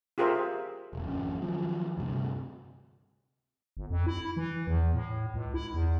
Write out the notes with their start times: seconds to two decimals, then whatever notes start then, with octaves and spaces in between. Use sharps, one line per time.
0.18 F4 G4 G#4 A#4 C5 E5
0.93 E1 C#2
1.06 G#1 F2 C#4
1.42 D#3 F3 F#3
1.97 D2 G2 C3
3.77 G1
3.90 F2
4.07 E4
4.37 E3
4.67 E2
4.94 A2
5.34 C#2
5.54 E4
5.74 E2